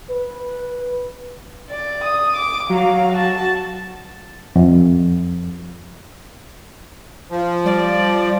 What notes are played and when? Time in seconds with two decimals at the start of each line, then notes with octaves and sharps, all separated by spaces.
0.10 B4
1.70 D5
2.04 D#6
2.36 D6
2.70 F#3 F5
3.12 F#4 A5
4.56 F2
7.31 F3
7.66 G3 D5